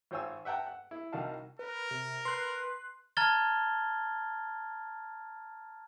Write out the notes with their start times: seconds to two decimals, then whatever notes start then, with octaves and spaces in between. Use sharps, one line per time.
0.11 G#1 F4 C5 C#5 G#5 E6
0.45 E5 F#5 G5 A5 A#5
0.67 F#5
0.91 E4
1.12 C2 D#3 D#4 F#4 F5 A5
1.59 A#4 B4
1.91 C3
2.25 B4 C6 F#6
3.17 A5 A#5 F6 G#6 A6 G7